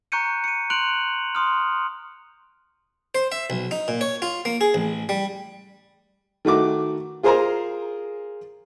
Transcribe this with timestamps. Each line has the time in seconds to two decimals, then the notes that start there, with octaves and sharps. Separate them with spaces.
0.12 A#5 C#6 F#6 G6 C#7 D#7
0.44 C#7 D#7
0.70 C6 F#6 D7 F7 F#7
1.35 C6 D#6 F6
3.15 C5
3.32 E5
3.50 B1
3.71 D#4
3.88 A#2
4.01 C#5
4.22 F4
4.45 A#3
4.61 G#4
4.74 A1
5.09 G3
6.45 D#3 A3 F#4 D6
7.23 F4 G#4 A#4 C5 G#5 A#5